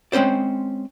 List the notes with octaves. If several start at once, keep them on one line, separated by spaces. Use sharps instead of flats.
G#3 C4 C#4 C5 D5